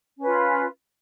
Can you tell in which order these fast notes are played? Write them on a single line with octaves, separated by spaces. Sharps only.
C#4 B4 F4